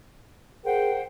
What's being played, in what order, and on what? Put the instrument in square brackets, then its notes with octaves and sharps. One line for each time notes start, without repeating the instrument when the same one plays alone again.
[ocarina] G#4 [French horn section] A#4 [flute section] C5 F#5 G5